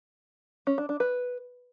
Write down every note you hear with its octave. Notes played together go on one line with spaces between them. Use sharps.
C#4
D4
D4
B4